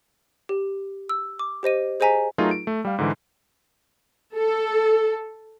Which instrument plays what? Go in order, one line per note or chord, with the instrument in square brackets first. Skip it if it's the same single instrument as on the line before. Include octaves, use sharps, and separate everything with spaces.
[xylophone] G4
E6
D6
G4 C5 D#5 D#7
G#4 C5 D#5 G#5 A#5 B6
[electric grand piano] F#3 A3 D#4 F4 G#4 A#4
D7
A3
G3 F5
G#2 D3 E3
[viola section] A4